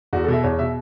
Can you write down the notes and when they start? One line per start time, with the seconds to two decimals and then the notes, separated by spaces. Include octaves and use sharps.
0.13 E2 F#4
0.24 A4
0.28 B2 E5
0.43 E2 C#5
0.59 B2 E5